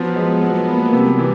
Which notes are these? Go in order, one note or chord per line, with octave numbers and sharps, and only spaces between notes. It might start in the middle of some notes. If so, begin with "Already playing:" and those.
Already playing: F3 F#3 B3
G#3
F#3 A#3
B3
C3 G3
E3